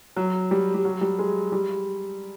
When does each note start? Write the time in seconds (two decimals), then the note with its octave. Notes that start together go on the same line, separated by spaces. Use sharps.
0.16 F#3
0.51 G3
0.74 G3
0.85 F#3
1.01 G3
1.19 G#3
1.52 G3